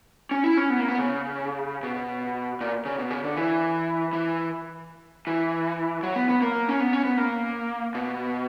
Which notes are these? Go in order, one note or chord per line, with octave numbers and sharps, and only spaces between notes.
C#4
E4
C#4
B3
A#3
B3
C#3
B2
A#2
C#3
B2
C#3
D3
E3
E3
E3
F#3
B3
B3
A#3
C#4
B3
C#4
B3
A#3
B2